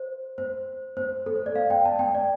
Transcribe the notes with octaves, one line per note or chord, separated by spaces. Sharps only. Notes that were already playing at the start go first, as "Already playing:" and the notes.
Already playing: C5
C5
C5
A4
C5
D5
F5
G5
A5
G5
D5